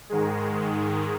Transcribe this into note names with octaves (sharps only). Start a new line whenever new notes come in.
G#2 D#3 G#3